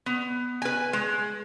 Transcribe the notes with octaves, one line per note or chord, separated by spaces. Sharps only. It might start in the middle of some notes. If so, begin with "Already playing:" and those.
B3
B4 G#5
G#3